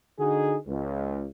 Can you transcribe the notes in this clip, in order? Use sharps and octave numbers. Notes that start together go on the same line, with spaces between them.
D3 D#4 F#4 G#4
C#2